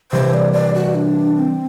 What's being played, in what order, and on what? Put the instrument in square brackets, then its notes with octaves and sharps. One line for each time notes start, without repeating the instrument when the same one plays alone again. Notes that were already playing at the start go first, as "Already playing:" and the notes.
[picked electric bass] C3 E3 G3 [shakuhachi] C5
[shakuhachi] D5
D5
F#4
D4
C4